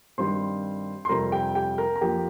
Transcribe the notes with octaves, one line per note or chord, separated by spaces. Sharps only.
G2 D#3 G3 C4 C5 C6
C6
F2 C3 G3 C4 A#4 A#5
G4 G5
G4 G5
A#4 A#5
A#5
F2 F3 A#3 G4 G5